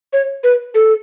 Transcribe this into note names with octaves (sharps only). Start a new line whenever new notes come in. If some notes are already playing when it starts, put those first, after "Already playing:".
C#5
B4
A4